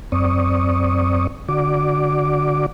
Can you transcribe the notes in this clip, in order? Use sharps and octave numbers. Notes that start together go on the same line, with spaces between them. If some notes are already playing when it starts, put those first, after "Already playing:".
F#2 C4 D5 C#6 D#6
D3 F#4 D5 D6